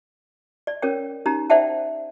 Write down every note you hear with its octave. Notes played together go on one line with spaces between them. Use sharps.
D5
C#4 A#4 C#5 G5
C#4 D#4 G4 A#5
C5 D5 E5 F#5 G5 A5